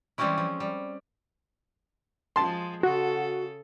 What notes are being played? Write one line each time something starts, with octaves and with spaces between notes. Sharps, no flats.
E3 G3 G#3 C4 C#4 E4
F3
G3
F3 G#3 A5 C6
C#3 F#4 A4